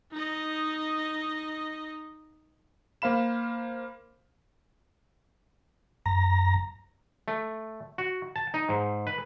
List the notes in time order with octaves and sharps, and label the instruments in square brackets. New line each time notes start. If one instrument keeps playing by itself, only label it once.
[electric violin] D#4 D#5
[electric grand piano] A#3 C5 F5 B5 E7
[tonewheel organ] F#2 A#5 A#6
[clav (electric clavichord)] A3
F#4
A5
D#4
G#2
B4